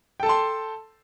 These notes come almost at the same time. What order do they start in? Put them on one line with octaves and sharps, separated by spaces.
G5 A4 A5 C6